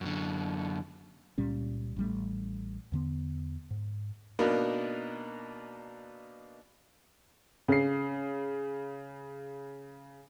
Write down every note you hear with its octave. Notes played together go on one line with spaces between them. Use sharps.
F#2 D3
C#2 A#2 G3 C#4
A1 G3 A3
E2 D3 B3
G#2
B2 A#3 B3 D4 D#4 A#4
C#3 C7